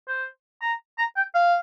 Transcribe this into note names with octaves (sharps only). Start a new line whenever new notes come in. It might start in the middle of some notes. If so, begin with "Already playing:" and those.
C5
A#5
A#5
G5
F5